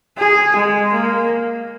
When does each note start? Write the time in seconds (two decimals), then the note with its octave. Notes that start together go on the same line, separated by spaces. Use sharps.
0.19 G#4
0.56 G#3
0.93 A#3